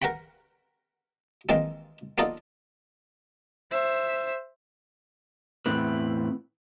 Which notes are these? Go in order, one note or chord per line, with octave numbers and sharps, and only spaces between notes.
A#4 B4 F#5 G5 B5
D#3 E3 G#3 A#3 C4 D#4
A#3 B3 D4 D#4 F4 A4
C5 E5
E2 A2 C4 E4 B4